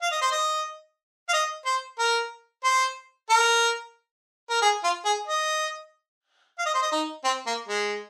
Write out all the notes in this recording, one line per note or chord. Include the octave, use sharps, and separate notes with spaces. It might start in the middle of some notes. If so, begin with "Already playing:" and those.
F5
D#5
C5
D#5
F5
D#5
C5
A#4
C5
A#4
A#4
G#4
F4
G#4
D#5
F5
D#5
C5
D#5
D#4
C4
A#3
G#3